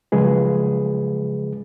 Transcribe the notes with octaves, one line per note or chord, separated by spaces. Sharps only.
C#3 F3 F#3 G#3 G#4 B4